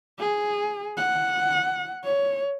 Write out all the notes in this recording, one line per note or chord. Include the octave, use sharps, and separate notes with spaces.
G#4
F#5
C#5